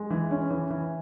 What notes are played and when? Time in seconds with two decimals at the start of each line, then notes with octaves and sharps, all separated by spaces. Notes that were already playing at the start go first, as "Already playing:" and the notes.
Already playing: G#3
0.10 E3
0.31 C#4
0.50 E3
0.70 E3